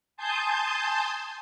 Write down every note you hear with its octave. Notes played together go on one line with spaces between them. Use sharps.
G#5 A5 C6 D#6 G6